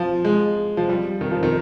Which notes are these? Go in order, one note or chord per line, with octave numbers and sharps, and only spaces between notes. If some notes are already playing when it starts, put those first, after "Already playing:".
Already playing: F3
G#3
F3
G3
D#3
F3
D#3